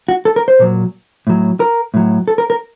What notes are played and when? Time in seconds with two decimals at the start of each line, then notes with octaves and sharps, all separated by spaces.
0.08 F#4
0.25 A4
0.36 A#4
0.48 C5
0.59 A#2 F#3
1.27 A2 F#3
1.60 A#4
1.94 A2 F#3
2.28 A4
2.38 A#4
2.50 A#4